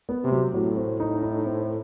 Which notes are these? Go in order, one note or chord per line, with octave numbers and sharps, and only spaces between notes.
B3
C3
F#3
A2 F#3
C4
D#4
D#4
C4